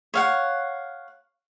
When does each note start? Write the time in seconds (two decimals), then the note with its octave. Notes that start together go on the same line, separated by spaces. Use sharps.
0.14 C#5 F5 F#5